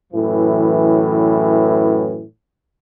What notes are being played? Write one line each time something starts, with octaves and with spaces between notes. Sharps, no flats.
F#2 A2 E3